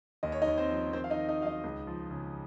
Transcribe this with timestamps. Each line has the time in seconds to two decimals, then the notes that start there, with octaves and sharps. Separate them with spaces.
0.23 D#2 D#5
0.32 C#5
0.42 D#4 D#5
0.47 D#2
0.58 C4 C5
0.70 F3
0.93 D#3 C4 C5
1.04 F5
1.10 D#4 D#5
1.16 D#3
1.29 D#4 D#5
1.40 F#3 F5
1.46 D#4 D#5
1.64 C#2
1.87 F3
2.11 C#3